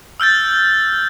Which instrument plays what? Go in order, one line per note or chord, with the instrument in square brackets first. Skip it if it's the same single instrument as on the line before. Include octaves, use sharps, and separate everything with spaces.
[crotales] E6 F6 G6 A6